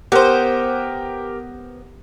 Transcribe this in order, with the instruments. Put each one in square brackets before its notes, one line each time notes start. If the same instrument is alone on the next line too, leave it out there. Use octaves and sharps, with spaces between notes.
[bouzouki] B3 C5 [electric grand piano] G4 A#4